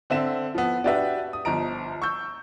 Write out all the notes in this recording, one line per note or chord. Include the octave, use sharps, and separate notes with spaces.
D3 C4 E5 E7
F3 B3
D4 F#4 G4 B4 E5
D#6
G1 F3 D#5 A#5 D7
C#6 E6 G6